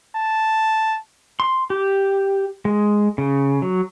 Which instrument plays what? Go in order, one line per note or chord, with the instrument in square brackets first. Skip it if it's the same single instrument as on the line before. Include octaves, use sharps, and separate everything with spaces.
[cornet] A5
[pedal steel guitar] C6
G4
G#3
C#3
F#3